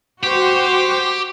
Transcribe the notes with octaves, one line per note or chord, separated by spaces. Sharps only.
F#4 G4 C5